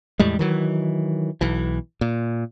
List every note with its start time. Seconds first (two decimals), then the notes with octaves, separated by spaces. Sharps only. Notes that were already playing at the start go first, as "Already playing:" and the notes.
0.19 E2 A2 G3 G#3
0.39 D#3 E3 F#3
1.41 B1 E3
2.01 A#2